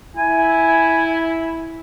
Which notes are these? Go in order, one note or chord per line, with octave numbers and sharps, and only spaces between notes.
E4 G#5